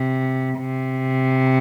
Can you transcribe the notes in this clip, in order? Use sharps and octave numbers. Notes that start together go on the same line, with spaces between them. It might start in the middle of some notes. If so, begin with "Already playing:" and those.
Already playing: C3
C3